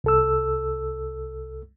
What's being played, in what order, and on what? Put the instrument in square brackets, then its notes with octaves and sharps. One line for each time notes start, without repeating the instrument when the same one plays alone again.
[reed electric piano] C2 A4 E6